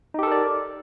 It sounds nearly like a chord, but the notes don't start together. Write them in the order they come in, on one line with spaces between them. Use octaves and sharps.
D#4 G4 A4 A#4 D5